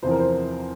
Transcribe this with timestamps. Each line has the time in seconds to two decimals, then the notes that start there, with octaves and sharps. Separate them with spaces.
0.02 E2 C3 F3 C5
0.11 A#4
0.20 C5